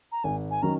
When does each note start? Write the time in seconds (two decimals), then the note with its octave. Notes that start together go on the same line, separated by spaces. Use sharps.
0.12 A#5
0.24 G#1 G#5
0.51 G#5
0.62 D#3 F#3 C#4 A#5